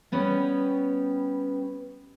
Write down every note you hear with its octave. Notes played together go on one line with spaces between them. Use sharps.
G3 B3 C#4 G4 B4